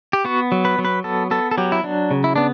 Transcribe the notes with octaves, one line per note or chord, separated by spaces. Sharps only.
G4
B3 F#4
F#3
B4
F#3
B4
B3 A4
B3 A4
A4
F#3 G4
E4
F#3 D4
C#3
E4
B3 D4